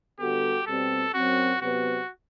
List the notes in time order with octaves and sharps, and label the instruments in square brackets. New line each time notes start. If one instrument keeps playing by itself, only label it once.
[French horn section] D3 G3 B3 F#4 A4 [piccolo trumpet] G4
[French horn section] B2 G3 C4 [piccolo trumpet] A4
[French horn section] F#2 F#3 C4 [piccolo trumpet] F#4
[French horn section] C3 F#3 B3 [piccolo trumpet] F#4